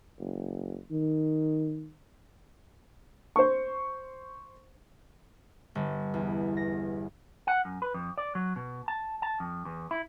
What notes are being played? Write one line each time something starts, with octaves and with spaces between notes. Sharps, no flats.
F#1
D#3
C5 C#6
G1
E2
A#6
F#5
F#2
B4
F2
D5
F#3
B2
A5
A5
F2
E2
E4